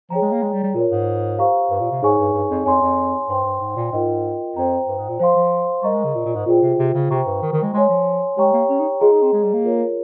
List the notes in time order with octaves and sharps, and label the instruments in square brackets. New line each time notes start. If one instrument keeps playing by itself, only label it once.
[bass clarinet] F3 [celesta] G#4 C#5 G5 A#5
[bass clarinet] G#3
A#3
G#3
G3
G3
[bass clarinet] A#2 [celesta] F4 A#4 C#5
[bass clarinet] G#2
[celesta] G4 C5 F5 A#5 C#6
[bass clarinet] G2
A#2
C3
[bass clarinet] G#2 [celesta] D#4 G#4 C#5 G#5 C#6
[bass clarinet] G2
G2
F2
[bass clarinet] F2 [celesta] C#5 G#5 C6
[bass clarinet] F2
[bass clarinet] G2 [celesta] C5 G5 C6
[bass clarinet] G2
G#2
A#2
[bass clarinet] G#2 [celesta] F4 A#4 D#5 G5
[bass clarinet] F2 [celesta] C5 G5 A#5
[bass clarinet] G2
G#2
A#2
[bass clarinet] F3 [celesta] C5 F5 C6
[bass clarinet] F3
[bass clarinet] G3 [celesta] A#4 D#5 A#5 C#6
[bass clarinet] G#3
C#3
A#2
A#2
G#2
[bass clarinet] A#2 [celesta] F4 G#4 C5 G5
[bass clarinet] C3
C3
C#3
[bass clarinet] C3 [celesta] C5 G5 A#5 C#6
[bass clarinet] G2
D#3
D#3
G#3
[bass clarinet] G#3 [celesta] C#5 G#5 C6
[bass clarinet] F3
[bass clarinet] G#3 [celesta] G4 C#5 G5 A#5 C#6
[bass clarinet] A#3
C#4
D#4
[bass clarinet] F4 [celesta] G#4 D#5 A#5
[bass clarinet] D#4
C4
G#3
G3
A#3
[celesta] F4 A#4 C#5